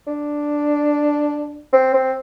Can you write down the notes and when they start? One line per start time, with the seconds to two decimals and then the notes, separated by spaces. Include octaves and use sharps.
0.07 D4
1.73 C4
1.94 C4